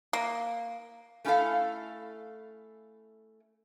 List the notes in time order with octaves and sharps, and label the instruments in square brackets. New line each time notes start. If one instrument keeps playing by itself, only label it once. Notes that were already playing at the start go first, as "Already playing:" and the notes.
[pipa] A#3
[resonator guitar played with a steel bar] A3 C#4 E4 G4 A4 F5